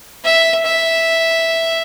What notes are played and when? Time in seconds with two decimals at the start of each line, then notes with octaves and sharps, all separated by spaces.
0.25 E5
0.65 E5